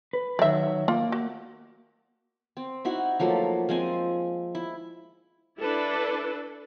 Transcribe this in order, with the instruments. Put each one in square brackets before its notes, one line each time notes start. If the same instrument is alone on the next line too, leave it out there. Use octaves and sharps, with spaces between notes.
[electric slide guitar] B4
[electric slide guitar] D#3 F#3 [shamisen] D5 E5
[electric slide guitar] A#3 [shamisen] F4
[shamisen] F#4
[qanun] C4
D#4 E4 F#4
F3 F#3 A3 A#3
F3 G#3 C4 G#5
E4
[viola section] D4 E4 A4 B4 D5